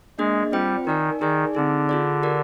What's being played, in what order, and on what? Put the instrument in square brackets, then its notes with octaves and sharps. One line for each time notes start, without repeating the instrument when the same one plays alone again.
[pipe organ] G#3 [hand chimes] A#3 D4 G#4 D#5
[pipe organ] G3 [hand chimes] C4 F4 C5 G5
[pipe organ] D#3 [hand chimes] D#4 A#4 D5 G#5
[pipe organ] D#3 [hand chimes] D#4 G#4 D5 G#5
[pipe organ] D3 [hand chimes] C4 D#4 G#4
[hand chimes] F4 G#4 D5
G4 A#4 D5